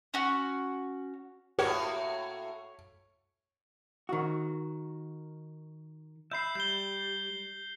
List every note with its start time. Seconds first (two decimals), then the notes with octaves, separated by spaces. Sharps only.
0.14 C#4 F#4
1.59 A2 A#3 F#4 G4 A#4 C#5 F#5
4.09 D#3 F#4
6.31 E5 B5 G6 C7
6.55 G3 G6 G7